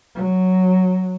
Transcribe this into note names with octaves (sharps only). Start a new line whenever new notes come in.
F#3